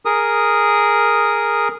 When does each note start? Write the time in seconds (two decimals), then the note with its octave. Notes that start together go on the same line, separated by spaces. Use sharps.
0.05 G#4 A#4 D#6